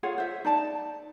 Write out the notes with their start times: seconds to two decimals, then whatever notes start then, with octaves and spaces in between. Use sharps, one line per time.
0.03 F4 G#4 C#5 F#5
0.18 C5 E5
0.45 D#4 D5 A5